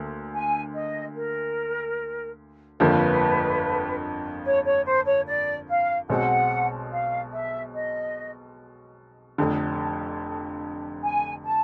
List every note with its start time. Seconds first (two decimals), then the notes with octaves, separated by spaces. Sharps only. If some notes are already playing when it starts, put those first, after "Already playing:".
Already playing: D2 D3 A#3
0.33 G#5
0.75 D#5
1.15 A#4
2.80 G1 F2 D3 F3 A#3 B4
4.45 C#5
4.65 C#5
4.86 C5
5.06 C#5
5.27 D5
5.68 F5
6.09 B1 B2 G#3 C4 F#5
6.91 F5
7.32 E5
7.74 D#5
9.38 F1 F2 D3
11.03 G#5
11.44 A5